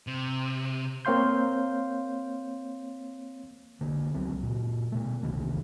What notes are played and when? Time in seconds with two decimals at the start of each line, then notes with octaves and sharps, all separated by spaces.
0.07 C3
1.05 A#3 C4 C#5 F5 C6 G6
3.81 D3 A#3
4.14 C#2 F#3 C4
4.43 A#2 C#3
4.92 B2 A3
5.23 E1 C2 D#3 A#3